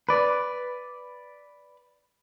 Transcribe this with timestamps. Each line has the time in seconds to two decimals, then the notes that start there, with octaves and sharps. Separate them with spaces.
0.09 B4 D5